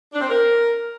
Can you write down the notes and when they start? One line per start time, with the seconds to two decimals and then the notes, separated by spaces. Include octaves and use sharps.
0.13 D4
0.21 C4
0.29 A#4